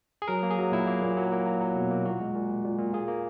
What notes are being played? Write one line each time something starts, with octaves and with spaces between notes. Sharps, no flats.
G#4
F#3 A#4
A#3
G#4
F#3
A#2 E4
A#3
A#2
F#3
A#3
F#3
F#3
B2
A#3
A#2 F#4
G#3
A#2
A#2
A#2
A#2
A#3 G#4
A#3